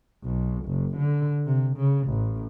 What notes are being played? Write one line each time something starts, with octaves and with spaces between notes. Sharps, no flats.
B1
F#1
D3
C3
C#3
A1